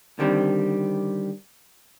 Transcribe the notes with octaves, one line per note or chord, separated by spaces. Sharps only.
D3 D#3 G3 C4